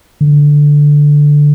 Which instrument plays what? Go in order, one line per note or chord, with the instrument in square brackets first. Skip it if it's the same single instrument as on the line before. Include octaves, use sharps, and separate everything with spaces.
[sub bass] D3